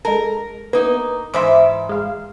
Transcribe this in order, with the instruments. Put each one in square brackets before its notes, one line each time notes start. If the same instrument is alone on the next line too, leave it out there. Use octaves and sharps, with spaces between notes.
[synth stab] G#3 A4 [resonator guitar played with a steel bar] A#4
[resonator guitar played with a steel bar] A#3 D#4 [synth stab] B3
[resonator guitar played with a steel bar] G#2 E3 E5 [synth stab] C5 D6
[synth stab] G#3 F5